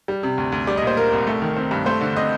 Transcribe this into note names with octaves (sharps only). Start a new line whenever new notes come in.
G3
C3
D2
D2
G3 D5
D#5
A#2 C5
A#3 A#4
C2
A3
D#3
C4
G2
A3 C5
D3
C4 D#5